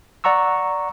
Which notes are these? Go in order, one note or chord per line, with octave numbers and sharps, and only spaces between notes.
D5 F#5 A#5 C#6 E6